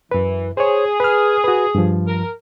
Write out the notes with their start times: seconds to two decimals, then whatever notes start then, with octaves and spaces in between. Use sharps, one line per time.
0.11 F#2 E3 B4
0.57 G#4 C5 C#5
1.00 B4 F6
1.44 F#4 B4
1.75 G2 F3
2.07 A#4